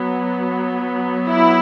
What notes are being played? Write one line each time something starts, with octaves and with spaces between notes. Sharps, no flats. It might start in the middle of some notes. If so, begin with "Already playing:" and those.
Already playing: F#3 B3
E4